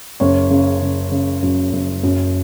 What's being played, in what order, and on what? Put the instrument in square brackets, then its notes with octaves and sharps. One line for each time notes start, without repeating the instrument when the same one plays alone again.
[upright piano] F#1 C#5
C#3
C#3
C#3
F#2
F#1
F#2